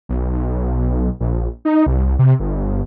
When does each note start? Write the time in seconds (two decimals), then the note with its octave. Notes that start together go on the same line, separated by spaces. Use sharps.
0.09 B1
1.20 A#1
1.65 D#4
1.86 C2
2.19 C3
2.40 G1